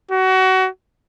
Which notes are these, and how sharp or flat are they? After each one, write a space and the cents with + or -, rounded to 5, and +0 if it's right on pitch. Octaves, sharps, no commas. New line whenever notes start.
F#4 +25